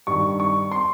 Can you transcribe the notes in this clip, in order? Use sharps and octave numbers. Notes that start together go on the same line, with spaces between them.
G2 D#3 C#6
C#6
C6